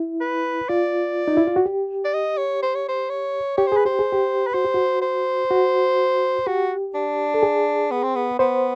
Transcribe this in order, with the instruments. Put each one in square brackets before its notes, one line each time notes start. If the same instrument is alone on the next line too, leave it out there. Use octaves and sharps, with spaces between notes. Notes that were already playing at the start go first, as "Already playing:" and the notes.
Already playing: [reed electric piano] E4
[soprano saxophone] B4
[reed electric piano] F4 [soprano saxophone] D5
[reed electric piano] D#4
E4
F4
F#4
G4
[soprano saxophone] D5
D#5
C#5
C5
C#5
C5
C#5
[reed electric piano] G4 [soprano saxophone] C#5
[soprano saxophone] C5
[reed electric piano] G#4
[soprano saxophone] B4
[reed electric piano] G4 [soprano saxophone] C5
[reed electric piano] G#4
G4
[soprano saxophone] B4
[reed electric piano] F#4 [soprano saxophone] C5
[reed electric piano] G4
F#4
[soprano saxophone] C5
[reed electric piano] F#4
[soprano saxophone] F#4 [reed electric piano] G4
[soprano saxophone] D4
[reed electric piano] A4
G#4
[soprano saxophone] B3
C4
B3
[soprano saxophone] B3 [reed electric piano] C5